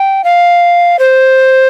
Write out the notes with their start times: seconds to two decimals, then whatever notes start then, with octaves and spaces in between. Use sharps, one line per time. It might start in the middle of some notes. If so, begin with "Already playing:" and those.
Already playing: G5
0.24 F5
0.99 C5